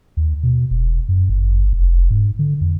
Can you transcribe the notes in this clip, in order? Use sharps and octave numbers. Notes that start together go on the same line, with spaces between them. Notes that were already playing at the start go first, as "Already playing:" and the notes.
D#2
B2
E1
F#2
G1
F1
G#2
D3
F2